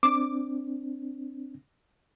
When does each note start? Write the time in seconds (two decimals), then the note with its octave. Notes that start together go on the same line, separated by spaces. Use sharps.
0.03 C4 D4 D6